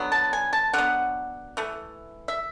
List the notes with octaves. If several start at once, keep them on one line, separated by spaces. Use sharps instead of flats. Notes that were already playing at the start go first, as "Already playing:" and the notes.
Already playing: D3 F#3 B3
A5
G#5
A5
D3 F#3 B3 F#5
E3 A3
E5